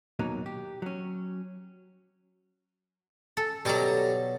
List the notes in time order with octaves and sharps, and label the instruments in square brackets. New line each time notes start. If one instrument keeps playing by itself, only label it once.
[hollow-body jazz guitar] D#2 B2 F#3 A#3 D#4
G4
F#3 C#4
[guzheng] A4
[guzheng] B2 F#3 [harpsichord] G3 A4 A#5